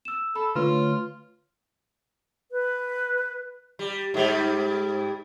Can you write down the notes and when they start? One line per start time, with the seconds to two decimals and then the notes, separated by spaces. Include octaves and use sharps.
0.05 E6 E7
0.36 A4 B5
0.56 D3 A3 F4 B4 C#5
2.52 B4
3.79 G3
4.14 G#2 G3